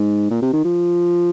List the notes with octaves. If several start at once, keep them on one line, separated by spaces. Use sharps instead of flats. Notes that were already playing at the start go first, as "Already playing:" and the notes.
Already playing: G#2
A#2
C3
D#3
F3